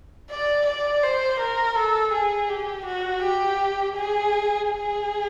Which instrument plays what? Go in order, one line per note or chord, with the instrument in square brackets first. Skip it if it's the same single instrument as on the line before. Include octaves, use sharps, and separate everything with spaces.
[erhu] D5
D5
C5
A#4
A4
G#4
G4
F#4
G4
G#4
G#4